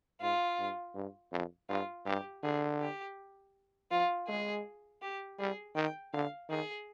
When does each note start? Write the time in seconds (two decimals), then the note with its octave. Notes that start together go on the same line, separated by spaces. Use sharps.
0.21 G#2 F4
0.59 G2
0.95 G2
1.32 F2
1.69 G2 F4
2.06 G2 G4
2.43 D3 G#4
2.81 G4
3.91 F3 F4
4.28 G#3 G#4
5.02 G4
5.39 G3 G#4
5.76 D#3 G5
6.13 D3 F5
6.49 D#3 G#4